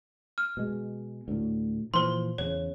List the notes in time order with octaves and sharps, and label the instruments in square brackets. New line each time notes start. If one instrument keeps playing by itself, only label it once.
[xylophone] F6
[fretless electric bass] B2 G#3
D2 A2
[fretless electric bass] A#2 E3 F3 [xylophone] C5 C6
[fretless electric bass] E2 C#3 [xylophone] C#5